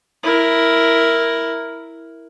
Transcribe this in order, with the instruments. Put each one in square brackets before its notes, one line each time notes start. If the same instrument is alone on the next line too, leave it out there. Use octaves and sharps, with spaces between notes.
[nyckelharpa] E4 A#4